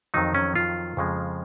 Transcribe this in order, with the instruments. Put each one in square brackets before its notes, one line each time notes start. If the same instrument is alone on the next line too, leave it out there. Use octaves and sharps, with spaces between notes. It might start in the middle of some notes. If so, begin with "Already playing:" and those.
[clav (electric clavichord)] F2 D#3 F#3 D#4
C#4
F4
F2 C#3 F3 G#3